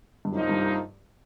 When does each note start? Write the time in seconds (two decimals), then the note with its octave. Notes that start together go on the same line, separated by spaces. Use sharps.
0.25 G2
0.32 C2 F#2 C3 F3 A#3 D#4
0.49 G2